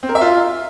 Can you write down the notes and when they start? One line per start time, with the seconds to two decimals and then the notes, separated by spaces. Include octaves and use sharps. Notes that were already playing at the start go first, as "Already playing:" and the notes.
0.03 C4
0.09 A#4
0.15 E5
0.21 F4